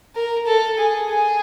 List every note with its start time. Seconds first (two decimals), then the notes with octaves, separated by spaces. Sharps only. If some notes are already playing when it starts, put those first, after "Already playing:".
0.15 A#4
0.47 A4
0.78 G#4
1.10 G#4